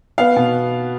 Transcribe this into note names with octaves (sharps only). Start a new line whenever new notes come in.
B3 F5
B2